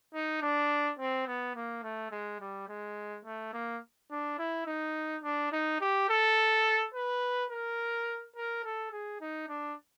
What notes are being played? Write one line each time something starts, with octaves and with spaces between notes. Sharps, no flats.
D#4
D4
C4
B3
A#3
A3
G#3
G3
G#3
A3
A#3
D4
E4
D#4
D4
D#4
G4
A4
B4
A#4
A#4
A4
G#4
D#4
D4